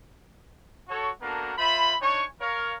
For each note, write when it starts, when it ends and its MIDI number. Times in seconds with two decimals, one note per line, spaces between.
0.89 1.11 66
0.89 1.11 69
0.89 1.11 73
1.21 1.53 58
1.21 1.53 59
1.21 1.53 62
1.21 1.53 66
1.21 1.53 69
1.21 1.53 70
1.58 1.95 65
1.58 1.95 72
1.58 1.95 76
1.58 1.95 83
2.01 2.25 62
2.01 2.25 63
2.01 2.25 73
2.01 2.25 80
2.01 2.25 85
2.41 2.75 70
2.41 2.75 73
2.41 2.75 77